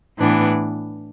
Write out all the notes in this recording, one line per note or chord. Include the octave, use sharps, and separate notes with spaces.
A2 E3 B3 D4